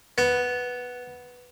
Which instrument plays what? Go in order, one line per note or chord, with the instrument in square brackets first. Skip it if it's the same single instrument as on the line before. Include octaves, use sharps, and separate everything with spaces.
[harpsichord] B3